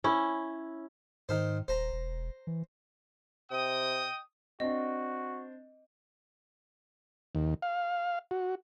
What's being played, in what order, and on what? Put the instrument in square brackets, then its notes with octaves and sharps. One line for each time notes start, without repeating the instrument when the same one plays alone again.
[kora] C#4 E4
[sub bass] G#2 [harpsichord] D#3 C5
[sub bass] D#1 [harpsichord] C5 A#5
[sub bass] E1
E3
[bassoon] C3 [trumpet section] D#5 G5 D#6
[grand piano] C4 D4 [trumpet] F#4 [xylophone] D#5
[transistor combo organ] D#2
F5
F#4